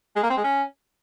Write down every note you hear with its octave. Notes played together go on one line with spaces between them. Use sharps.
G#3
A#3
C4
G#3
C#4